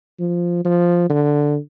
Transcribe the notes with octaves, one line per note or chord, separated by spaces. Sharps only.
F3
F3
D3